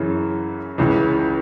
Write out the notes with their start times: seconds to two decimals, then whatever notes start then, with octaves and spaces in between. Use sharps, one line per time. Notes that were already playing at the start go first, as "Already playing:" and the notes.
Already playing: F#2 C#3 E3
0.78 C#2 C#3 E3